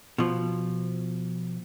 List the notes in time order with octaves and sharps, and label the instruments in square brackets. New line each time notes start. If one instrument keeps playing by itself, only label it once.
[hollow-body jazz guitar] B2 F3